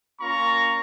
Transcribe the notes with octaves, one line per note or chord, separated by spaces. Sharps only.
A#3 C#4 F4 A#5 C#6